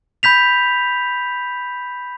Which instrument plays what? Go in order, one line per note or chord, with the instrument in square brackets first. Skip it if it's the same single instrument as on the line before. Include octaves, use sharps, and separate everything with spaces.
[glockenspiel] B5 G6 B6 F7